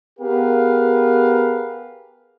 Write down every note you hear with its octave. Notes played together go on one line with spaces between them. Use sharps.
B3 G4 G#4 A#4 B4 F5